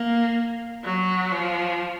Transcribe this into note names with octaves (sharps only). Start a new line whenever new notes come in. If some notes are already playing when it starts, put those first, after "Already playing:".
Already playing: A#3
F#3
F3